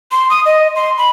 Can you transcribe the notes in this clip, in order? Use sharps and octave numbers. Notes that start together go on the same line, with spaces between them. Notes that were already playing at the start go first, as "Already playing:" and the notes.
C6
D#6
D#5
C6
B5